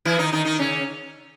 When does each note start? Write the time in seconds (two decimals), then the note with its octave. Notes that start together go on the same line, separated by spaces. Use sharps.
0.05 E3 E4
0.18 D#3 D#4
0.32 D#3 D#4
0.45 D#3 D#4
0.59 C#3 C#4